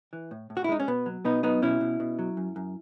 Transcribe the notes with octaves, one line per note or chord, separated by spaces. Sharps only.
E3
A2
A2
F#4
E4
G#3 D#4
C#4
B2 B3
F#3
B2 B3 D#4
F#3 B3 D#4
B2 C#4 E4
B2
B2
F#3
F#2
F#2